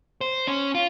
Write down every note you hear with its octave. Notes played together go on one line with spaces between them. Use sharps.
C5
C#4
F4